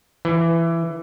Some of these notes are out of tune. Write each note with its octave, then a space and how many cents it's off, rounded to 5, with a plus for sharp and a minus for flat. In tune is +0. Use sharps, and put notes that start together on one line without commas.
E3 +15